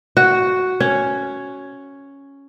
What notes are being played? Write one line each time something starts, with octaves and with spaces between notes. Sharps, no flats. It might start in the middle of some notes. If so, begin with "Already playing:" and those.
F#4
C#4